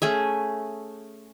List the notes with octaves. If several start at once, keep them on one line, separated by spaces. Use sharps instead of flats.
A3 C#4 G#4 E5